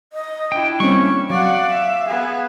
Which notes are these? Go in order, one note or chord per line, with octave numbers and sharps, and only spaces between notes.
D#5
D4 E4 G5
G3 A#3 C4 C#4 C#6
F#3 D5 F5 F#5
E5
B3 G#4